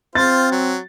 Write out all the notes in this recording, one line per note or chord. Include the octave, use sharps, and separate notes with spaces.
C4 F4 C5 A6
F#3